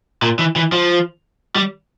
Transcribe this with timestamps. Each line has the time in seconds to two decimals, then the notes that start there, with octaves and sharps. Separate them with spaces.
0.22 A#2
0.39 E3
0.56 E3
0.72 F3
1.56 G3